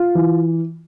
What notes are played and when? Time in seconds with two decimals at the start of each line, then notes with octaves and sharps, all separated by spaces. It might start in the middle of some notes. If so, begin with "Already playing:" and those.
Already playing: F4
0.15 E3